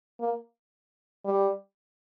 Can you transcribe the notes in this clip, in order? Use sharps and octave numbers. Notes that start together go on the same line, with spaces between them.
A#3
G3